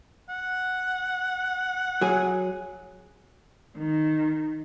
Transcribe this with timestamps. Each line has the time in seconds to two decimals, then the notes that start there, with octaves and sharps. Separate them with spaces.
0.29 F#5
2.01 F#3 G#4
3.77 D#3